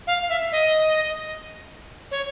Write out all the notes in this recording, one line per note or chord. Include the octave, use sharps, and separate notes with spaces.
F5
E5
D#5
C#5